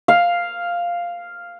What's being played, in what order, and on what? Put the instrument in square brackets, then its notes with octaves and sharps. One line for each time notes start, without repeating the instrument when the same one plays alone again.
[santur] F5